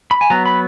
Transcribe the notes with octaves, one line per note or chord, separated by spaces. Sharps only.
B5
G#5
F#3 B3 A#5
B5